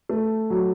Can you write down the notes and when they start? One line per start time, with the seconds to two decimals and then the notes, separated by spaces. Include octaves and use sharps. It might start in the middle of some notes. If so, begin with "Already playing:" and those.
0.09 A3
0.50 F#3